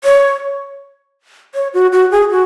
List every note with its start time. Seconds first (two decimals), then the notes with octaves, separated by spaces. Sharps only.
0.04 C#5
1.55 C#5
1.74 F#4
1.92 F#4
2.11 G#4
2.30 F#4